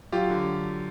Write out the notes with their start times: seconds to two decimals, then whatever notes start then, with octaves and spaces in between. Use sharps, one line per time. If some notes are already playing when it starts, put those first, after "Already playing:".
0.12 F#3 F4 G4
0.30 D3